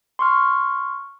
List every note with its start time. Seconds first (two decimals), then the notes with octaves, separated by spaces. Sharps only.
0.19 C6 C#6 F6